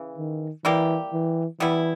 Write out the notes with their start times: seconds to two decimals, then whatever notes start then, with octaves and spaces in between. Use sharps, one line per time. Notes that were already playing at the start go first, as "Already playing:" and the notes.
Already playing: C#3 E3
0.18 D#3
0.65 E3 G3 A#3 E4 G4
1.13 E3
1.60 E3 G3 B3 E4